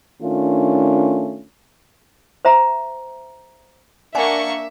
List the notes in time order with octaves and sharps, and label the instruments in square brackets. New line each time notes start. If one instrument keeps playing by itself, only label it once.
[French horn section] D#3 A3 C#4 D4 F4
[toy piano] C5 E5 A#5
[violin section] A#3 D4 C#6 [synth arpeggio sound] D5 F#5 G#5 [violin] E5